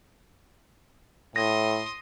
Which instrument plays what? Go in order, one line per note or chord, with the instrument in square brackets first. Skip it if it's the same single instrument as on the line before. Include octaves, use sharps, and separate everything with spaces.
[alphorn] A2 [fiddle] C6 D#6 [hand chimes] A#6